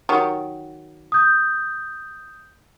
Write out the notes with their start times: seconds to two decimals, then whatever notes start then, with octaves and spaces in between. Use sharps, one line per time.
0.09 D#3 F#3 G4
1.12 D#6 G6